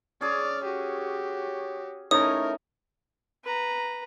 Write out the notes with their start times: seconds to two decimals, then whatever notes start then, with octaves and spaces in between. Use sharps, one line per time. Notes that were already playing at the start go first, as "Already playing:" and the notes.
0.21 C#4 G#4 C#5 D5 F6
0.64 F#4 G4
2.11 E3 A3 C#4 D#4 A#4 D#6
3.44 B4 A#5